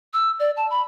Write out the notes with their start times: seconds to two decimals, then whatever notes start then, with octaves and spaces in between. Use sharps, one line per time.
0.13 E6
0.39 D5
0.56 A5
0.70 B5